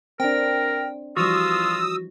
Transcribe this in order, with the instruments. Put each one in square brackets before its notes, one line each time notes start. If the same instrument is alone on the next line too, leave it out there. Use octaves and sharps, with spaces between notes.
[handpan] C4 D4 [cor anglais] A#4 [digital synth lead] G5
[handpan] E3 F3 G3 [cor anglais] F4 [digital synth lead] F#4 [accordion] D#6 E6